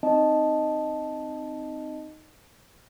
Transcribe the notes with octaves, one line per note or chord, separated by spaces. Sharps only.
C4 D#4 D#5 A5